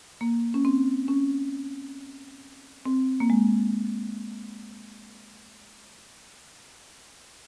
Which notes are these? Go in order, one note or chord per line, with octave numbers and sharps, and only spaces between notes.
A#3
C#4
C4
C#4
C4
A#3
G#3